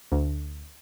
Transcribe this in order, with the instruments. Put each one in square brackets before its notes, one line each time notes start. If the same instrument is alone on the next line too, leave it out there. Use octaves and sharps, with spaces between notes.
[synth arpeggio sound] D2